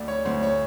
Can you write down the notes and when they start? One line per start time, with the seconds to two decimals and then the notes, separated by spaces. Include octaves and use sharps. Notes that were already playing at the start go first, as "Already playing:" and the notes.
Already playing: D2 D5
0.08 C#5
0.25 D2 C5
0.43 C#5